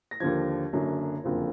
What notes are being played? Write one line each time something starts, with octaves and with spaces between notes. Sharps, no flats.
A#6
D#2 D3 F3 G#6
F#1 F#2 D3 F#3
F#1 F2 D3 F3